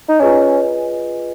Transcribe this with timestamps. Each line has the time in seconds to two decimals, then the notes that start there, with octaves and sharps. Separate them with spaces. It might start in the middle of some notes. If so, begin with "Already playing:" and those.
0.08 D#4
0.19 C#4 F4 G#4 B4 D#5 G#5